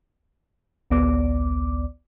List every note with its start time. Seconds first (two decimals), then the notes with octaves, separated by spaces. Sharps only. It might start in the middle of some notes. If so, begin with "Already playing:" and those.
0.90 A1 D2 B3 D5 D6